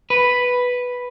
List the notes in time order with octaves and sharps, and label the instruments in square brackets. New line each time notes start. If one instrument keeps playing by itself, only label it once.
[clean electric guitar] B4